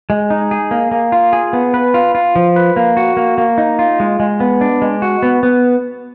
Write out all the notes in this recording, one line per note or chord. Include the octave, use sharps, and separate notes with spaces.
G#3
D#4
G#4
A#3
A#3
F4
G#4
B3
B4
F4
F4
F3
B4
A#3
F#4
A#3
A#3
D#4
F4
G#3
G#3
B3
D4
G#3
F#4
B3
B3